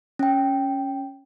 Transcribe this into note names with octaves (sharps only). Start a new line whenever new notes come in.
C#4 G5